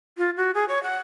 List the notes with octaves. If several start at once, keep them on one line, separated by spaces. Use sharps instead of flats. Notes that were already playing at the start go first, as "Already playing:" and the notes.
F4
F#4
G#4
C#5
F#5